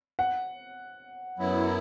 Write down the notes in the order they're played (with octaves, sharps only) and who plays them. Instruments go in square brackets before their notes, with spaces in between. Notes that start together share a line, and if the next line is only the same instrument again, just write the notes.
[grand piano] F#5
[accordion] F#2 F#3 B3 E4